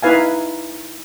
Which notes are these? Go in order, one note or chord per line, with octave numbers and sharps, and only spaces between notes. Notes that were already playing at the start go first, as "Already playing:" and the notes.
D#4 E4 B4 F5 G#5